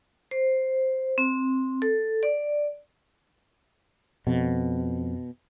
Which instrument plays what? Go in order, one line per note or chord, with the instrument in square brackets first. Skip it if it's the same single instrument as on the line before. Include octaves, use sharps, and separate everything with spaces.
[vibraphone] C5
C4
A4
D5
[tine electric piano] F2 [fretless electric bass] B2